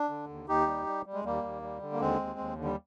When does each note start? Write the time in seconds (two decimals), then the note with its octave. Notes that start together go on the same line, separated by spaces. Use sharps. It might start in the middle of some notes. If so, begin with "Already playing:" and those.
Already playing: D4
0.09 D3
0.29 D#2
0.48 D#2 D#4 G4
0.67 G3
0.86 G3
1.06 G3
1.13 G#3
1.24 D#2 G3 A#3
1.43 D#2
1.62 G3
1.82 D3
1.93 A#3
2.00 D#2 G#3 C4
2.20 D#2
2.39 D#2
2.58 D3
2.64 G3